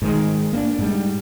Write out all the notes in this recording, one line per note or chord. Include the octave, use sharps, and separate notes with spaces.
G#2 D#3 G#3
A#3 C4 D4
G#2 G3